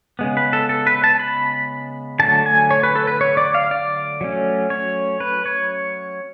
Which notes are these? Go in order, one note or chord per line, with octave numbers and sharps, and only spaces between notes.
C#3 G#3 B3
B4
A4
A4
B4
A5
B5
D3 F#3 A3 A5
G#5
C#5
B4
A4
B4
C#5
D5
F5
D5
F#3 A3 C#4
C#5
B4
C#5